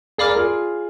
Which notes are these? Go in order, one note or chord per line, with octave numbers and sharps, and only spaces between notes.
G#4 D5 F5 B5 D6 F6
A#4
F4 G#4